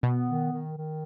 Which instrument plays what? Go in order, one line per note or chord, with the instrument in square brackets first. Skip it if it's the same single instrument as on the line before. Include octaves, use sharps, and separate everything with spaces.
[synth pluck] B2 [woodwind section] B3
[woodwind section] D#3
D#3
D#3